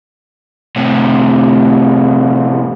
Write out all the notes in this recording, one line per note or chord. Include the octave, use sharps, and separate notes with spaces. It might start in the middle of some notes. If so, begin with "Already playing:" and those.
A2 C3